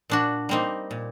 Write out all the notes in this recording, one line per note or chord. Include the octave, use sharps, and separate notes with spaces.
A#2 D4 F#4
G3 A#3 C4 D#4
A#2